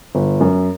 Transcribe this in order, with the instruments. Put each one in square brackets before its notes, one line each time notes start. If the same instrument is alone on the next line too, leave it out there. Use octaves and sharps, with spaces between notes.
[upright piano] G1
F#2